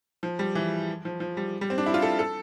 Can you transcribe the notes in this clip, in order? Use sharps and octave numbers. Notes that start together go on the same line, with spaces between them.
F3
G3
E3
F3
F3
G3
G3
C4
D4
E4
F4
A4
A4